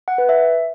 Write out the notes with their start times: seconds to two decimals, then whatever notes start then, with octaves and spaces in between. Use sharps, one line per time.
0.08 F#5
0.18 B4
0.29 E5